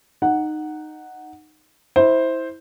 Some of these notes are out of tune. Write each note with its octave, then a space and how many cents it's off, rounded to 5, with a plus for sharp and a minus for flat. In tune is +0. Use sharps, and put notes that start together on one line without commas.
D#4 -15 F#5 +0
E4 -20 C5 +0